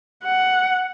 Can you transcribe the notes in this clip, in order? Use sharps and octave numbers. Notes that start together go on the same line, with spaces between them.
F#5